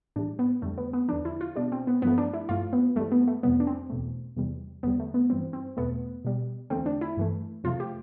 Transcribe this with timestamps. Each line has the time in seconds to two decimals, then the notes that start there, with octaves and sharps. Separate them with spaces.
0.16 A2 E3 G3 D4
0.39 B3
0.62 F2 D3 G3 A3
0.78 B3
0.93 B3
1.08 E2 D3 F3 D4
1.25 E4
1.41 F4
1.55 B2 G3 D4
1.72 C4
1.87 B3
2.02 G2 F3 A3 B3
2.18 D4
2.34 E4
2.49 G2 F3 A3 F4
2.73 B3
2.96 G2 E3 G3 A3
3.12 B3
3.27 A3
3.43 F2 C3 G3 B3
3.60 D4
3.67 C4
3.90 E2 B2 A3
4.36 E2 C3 E3 G3
4.83 E2 D3 G3 B3
5.00 A3
5.14 B3
5.30 G2 E3 G3 C4
5.53 C4
5.77 E2 B2 A3 B3
6.25 B2 G3
6.70 E2 D3 A3 C4
6.86 D4
7.01 E4
7.17 G2 E3 A3
7.64 F2 C3 F3 A3 F4
7.80 G4